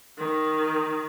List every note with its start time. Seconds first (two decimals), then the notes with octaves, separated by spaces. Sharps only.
0.19 D#3